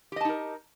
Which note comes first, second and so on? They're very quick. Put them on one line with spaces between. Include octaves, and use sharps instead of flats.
G4 D#5 A5 D#4 A#4